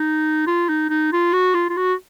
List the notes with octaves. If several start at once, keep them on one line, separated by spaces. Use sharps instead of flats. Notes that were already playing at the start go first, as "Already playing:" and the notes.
Already playing: D#4
F4
D#4
D#4
F4
F#4
F4
F4
F#4